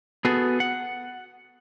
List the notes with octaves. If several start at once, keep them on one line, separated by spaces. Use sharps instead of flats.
B3 F#4 G#4 A4
F#5